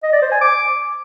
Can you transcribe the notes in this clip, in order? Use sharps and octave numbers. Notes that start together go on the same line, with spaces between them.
D#5
D5
C5
G#5
D6